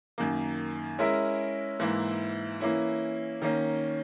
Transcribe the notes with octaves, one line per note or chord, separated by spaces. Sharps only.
F#2 D#3 A#3
G#3 C#4 E4 A#4 E5
G#2 E3 A#3 E4
E3 A#3 C#4 E4
D#3 A#3 C#4